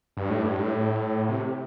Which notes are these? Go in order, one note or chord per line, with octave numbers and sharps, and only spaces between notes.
G2
A2
G2
A2
C3